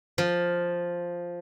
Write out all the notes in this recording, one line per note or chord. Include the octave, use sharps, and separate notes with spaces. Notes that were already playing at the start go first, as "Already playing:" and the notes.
F3